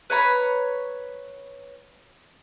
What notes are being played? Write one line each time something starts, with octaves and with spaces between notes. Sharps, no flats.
B4 C#5 A#5 B5